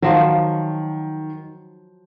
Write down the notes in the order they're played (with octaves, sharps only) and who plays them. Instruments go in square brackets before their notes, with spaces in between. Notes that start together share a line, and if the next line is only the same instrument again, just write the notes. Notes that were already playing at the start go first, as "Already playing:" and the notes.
[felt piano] D#3 [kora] F3 F#3